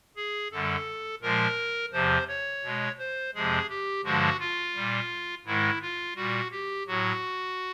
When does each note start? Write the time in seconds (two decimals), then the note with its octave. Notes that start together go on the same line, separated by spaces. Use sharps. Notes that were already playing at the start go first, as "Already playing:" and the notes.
0.16 G#4
0.52 F#2 D3 G3 A4
1.22 A#2 F3 G#3 A#4
1.92 E2 C3 F3 C5
2.28 C#5
2.64 B2 G#3
2.99 C5
3.34 F2 C3 F3 G#3 G#4
3.69 G4
4.04 G2 D3 F3 G#3 F#4
4.40 F4
4.76 A#2 G3
5.45 G#2 D#3 G#3 E4
5.82 F4
6.16 A#2 G3 F#4
6.51 G4
6.88 A2 F#3 F#4